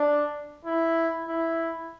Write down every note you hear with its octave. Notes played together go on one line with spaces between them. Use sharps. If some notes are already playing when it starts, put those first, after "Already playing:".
Already playing: D4
E4
E4